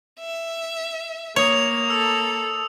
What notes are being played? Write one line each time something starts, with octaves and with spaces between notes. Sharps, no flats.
E5
A#3 C#5 D#6 F7
A4 E6